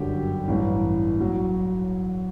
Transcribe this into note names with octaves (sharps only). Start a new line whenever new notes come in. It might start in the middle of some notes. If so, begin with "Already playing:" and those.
Already playing: G1 F#2 D3 F#3 G4
A1 G2 E3
F#3